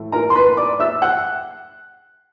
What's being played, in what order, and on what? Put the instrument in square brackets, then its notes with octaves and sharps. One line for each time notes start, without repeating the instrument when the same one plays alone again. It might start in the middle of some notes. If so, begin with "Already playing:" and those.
Already playing: [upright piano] A2 E3 A3
A#4 A#5
C6
B4 B5
D5 D6
E5 E6
F#5 F#6